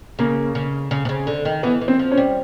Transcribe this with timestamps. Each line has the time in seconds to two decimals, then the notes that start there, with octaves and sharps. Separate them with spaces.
0.19 C#3 A#3
0.55 C#3
0.91 C#3
1.05 C3
1.09 C#3
1.27 D3
1.45 D#3
1.63 E3 B3
1.81 E3
1.88 C4
1.99 F3
2.12 C#4
2.18 G3